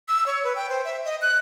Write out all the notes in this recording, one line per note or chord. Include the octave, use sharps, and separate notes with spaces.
E6
C#5
B4
G5
C5
E5
D#5
F#6